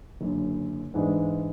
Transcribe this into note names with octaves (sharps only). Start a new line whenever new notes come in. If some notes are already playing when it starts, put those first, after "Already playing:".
F#1 F#2 D3
G#2 E3 G#3 B3 D4